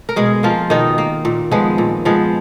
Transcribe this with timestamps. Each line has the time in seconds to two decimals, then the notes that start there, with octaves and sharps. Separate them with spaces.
0.09 A#4
0.16 B2 G#3 G#4
0.43 F3 A#3 F4
0.70 B2 D#3 D#4
0.98 A#3
1.25 A#2
1.51 F3 G#3 B3
1.78 A#2
2.05 F3 G#3 B3